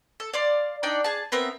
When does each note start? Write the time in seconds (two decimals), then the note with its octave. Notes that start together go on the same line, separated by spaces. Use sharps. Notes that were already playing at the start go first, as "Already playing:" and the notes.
0.20 A4
0.34 D5 F5 C6
0.83 D4 D#4 D5 G5
1.04 G#4 A5
1.32 B3 C4 A#4 E5